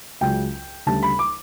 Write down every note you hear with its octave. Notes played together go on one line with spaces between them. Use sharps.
C#2 C#3 F#3 G5
D2 C#3 G3 A5
B5
D6